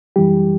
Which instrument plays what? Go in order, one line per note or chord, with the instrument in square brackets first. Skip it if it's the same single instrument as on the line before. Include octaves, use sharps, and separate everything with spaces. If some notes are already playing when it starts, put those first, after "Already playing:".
[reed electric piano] F#2 E3 G3 G4